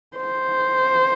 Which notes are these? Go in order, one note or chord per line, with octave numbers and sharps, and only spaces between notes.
C5